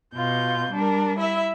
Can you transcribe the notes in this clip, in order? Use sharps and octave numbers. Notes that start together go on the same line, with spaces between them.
B2 F4 G6
G3 D4 A#4
E4 E5